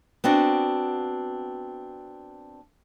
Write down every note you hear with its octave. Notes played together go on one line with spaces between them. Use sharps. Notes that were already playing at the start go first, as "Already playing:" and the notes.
B3 C4 D4 F#4